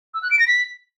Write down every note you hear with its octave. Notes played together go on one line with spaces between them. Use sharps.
E6
F#6
D7
A#6
B6